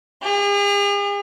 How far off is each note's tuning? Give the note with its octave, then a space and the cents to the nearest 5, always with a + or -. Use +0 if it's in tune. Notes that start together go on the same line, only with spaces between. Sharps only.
G#4 -45